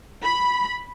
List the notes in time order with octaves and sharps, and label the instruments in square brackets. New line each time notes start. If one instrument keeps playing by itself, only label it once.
[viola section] B5